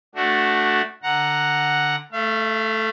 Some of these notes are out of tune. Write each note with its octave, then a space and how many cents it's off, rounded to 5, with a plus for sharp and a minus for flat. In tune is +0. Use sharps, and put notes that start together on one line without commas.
A3 +0 D4 +0 F#4 +0
D3 +10 F#5 +0 A#5 +0
A3 +0 F5 -45